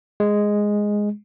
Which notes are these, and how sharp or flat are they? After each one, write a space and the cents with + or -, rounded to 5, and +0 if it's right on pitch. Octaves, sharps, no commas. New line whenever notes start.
G#3 -5